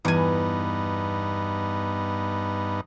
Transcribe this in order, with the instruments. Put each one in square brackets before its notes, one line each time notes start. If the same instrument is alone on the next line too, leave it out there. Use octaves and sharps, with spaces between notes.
[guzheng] E2 G#5 [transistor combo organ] G2 B3 D#4